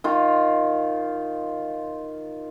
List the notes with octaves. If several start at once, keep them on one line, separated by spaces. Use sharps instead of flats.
D#3 F4